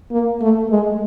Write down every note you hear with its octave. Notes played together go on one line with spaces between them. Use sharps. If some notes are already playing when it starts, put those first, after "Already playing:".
A#3
A3
G#3